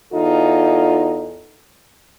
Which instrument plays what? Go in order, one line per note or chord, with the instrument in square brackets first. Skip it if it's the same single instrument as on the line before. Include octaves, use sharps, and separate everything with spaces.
[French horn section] E2 D#4 F4 A4